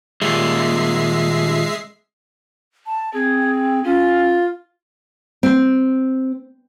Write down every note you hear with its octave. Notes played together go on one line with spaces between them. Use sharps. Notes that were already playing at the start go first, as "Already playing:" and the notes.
D#2 A#2 G#3 E5 C7
A5
C4 G#4
C#4 F4
C4